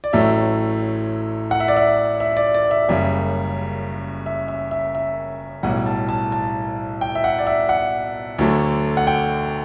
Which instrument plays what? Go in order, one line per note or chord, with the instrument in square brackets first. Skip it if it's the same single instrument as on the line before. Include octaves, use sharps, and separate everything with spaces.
[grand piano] D5
A1 A2 F#3 A3 E5
F#5
E5
D5
E5
E5
D5
D5
E5
F#1 F#2 C#3 G3 E5
E5
E5
E5
E5
B1 A2 G3 F#5
A5
A5
A5
G5
E5
F#5
D5
E5
F#5
D2 D3 F#3 A3
F#5
G5